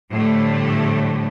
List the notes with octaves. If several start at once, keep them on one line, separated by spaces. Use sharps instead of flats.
A2 D3 F3 G3 A3